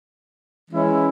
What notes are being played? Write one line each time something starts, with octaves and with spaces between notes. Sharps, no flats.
E3 G#3 C#4 E4